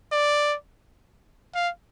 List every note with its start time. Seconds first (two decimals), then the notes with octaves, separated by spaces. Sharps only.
0.12 D5
1.55 F5